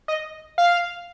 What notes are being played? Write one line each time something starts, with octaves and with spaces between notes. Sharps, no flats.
D#5
F5